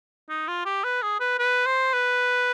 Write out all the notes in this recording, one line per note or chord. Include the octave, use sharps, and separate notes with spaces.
D#4
F4
G4
B4
G#4
B4
B4
C5
B4